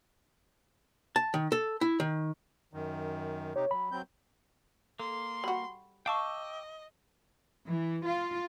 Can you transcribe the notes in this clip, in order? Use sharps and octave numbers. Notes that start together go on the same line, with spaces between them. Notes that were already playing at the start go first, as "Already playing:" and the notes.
A5
D#3
A4
E4
D#3
F#2 D#3
C3 D#4 G4 C#5
F#3 B5
F#3 C4 G6
A#3 A4 C6
G3 F#4 B5
D#5 F5 G5 A5 C#6 D6 E6
E3
F4